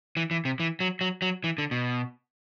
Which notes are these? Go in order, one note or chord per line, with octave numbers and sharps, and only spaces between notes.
E3
E3
C3
E3
F#3
F#3
F#3
E3
D3
B2